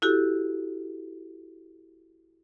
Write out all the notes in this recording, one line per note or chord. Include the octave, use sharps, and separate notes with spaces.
E4 F#4 G4 A4